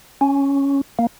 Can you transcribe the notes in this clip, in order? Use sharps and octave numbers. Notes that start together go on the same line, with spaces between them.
C#4
A#3